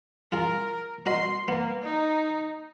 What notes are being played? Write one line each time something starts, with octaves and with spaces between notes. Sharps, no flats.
F4 G#4 A#4
F#4 A#4 D#5 C6
A#3 B3
D#4